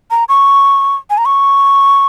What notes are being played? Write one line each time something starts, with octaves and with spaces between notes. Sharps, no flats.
A#5
C#6
G#5
A#5
C#6